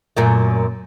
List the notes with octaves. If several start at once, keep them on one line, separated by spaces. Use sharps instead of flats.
F#2 A#2 A3